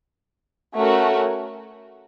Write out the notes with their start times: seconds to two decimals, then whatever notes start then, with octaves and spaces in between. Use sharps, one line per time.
0.75 A3 C#4 F#4 A#4